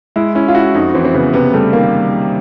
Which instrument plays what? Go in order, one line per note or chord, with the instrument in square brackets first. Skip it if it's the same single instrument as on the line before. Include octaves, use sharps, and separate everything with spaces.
[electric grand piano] G#3 [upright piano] E4
[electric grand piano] C#4 [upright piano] E4
[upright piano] F4
[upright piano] E4 [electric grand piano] F#4
[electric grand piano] F2 [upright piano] D#4
[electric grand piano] E3 [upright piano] C4
[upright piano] C4
[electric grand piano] C#3 [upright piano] B3
[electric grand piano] C3 [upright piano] B3
[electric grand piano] G3 [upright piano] A3
[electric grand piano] D#3 [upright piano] A#3